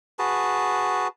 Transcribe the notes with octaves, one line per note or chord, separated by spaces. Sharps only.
F#4 G#4 B4 A5